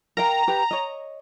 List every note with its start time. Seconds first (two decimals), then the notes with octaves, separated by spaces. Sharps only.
0.17 A#4 F5 G5 A#5
0.48 G4 B4
0.71 C#5 D#5